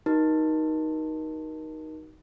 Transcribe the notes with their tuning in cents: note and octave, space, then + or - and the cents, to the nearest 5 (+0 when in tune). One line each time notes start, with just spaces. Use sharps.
D#4 +5 F#4 +35 A#4 +30